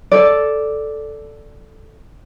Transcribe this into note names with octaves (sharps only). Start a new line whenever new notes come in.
A4 D5